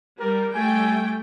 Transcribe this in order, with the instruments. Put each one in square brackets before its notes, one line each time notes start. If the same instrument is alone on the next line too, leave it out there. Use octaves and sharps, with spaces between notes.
[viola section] G3 [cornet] A#4
[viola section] G3 A3 G5 [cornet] G#5